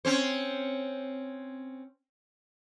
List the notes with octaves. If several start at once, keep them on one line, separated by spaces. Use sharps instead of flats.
C4 C#4 C5